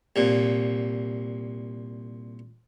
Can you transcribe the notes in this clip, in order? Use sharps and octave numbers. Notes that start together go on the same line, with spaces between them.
C2 A#2